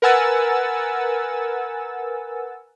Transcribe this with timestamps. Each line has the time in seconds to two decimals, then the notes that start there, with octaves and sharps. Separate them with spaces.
0.02 A#4 B4 F#5 G#5 E6 A6